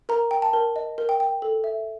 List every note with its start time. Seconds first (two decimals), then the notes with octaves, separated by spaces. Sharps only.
0.09 A#4 A#5
0.31 G5
0.42 A5
0.53 A#4
0.76 D#5
0.98 A#4
1.09 G5
1.20 G5
1.42 A4
1.64 E5